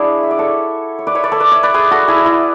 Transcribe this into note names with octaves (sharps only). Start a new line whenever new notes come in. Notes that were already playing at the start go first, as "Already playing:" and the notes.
Already playing: D4 E4 F#4 G#4
E5
D5
A4 C#5
C#5
B4 D5
C#5 E5
B4 D5
A4 C#5
B4 D5
C#5 E5
B4 D5
G#4 B4
F#4 A4
E4 G#4
E4